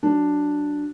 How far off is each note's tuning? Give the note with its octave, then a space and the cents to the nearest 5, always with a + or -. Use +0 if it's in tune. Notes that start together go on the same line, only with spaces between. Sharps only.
F#3 +0 D4 +0